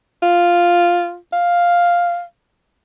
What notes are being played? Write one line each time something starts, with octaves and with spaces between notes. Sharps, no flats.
F4
F5